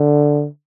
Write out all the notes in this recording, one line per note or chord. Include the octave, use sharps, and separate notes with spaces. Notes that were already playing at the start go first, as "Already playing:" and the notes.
Already playing: D3